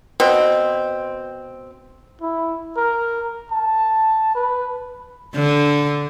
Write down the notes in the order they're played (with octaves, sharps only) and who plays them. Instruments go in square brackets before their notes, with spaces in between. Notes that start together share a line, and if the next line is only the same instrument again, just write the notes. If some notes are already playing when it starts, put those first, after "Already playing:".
[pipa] B2 C4
[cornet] E4
A#4
A5
B4
[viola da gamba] D3